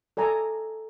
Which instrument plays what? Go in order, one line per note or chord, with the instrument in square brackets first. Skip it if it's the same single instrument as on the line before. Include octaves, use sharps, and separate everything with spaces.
[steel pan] A4 D5 G#5 A#5